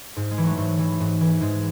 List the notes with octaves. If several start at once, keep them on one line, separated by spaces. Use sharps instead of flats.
G#2
G#3
E3
F#3 A3
G#2
E3
G#2
E3
G#2 G#3